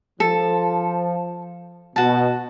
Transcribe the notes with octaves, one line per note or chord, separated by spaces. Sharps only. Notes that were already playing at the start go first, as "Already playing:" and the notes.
F3 A4
B2 F#4 A5